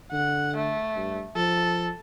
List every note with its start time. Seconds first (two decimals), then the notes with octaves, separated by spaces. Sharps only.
0.12 D3 F#5
0.57 A3
0.96 G2
1.36 F3 A4